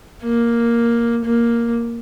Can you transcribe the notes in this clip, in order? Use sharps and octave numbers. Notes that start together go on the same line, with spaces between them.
A#3
A#3